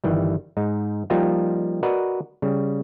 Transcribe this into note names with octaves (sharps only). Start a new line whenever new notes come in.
G1 D#3 E3 G3
G#2 D#4
F3 G3 A#3 D#4 F4 G4
F#4 A#4 B4 D5 D#5
C#3 G3